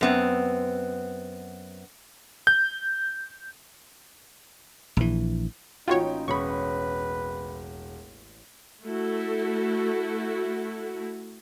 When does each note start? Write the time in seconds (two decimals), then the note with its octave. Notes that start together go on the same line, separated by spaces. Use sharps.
0.01 F#2 B3 C4
2.47 G6
4.97 A#1 E3
5.88 A1 A#3 C#4 D#4 F4 F#4 C#5 G5
6.28 E1 B4 C#5 B5 C#6 D#6
8.85 A3 E4 F#4 A4